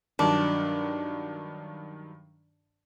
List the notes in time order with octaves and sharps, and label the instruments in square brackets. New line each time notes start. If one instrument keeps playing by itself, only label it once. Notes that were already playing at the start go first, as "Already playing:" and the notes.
[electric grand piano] G2 D#3 F#3 [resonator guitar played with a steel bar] D4